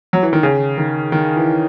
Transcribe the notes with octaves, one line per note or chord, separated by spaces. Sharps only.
F#3
E3
D#3
C#3
D#3
D#3
E3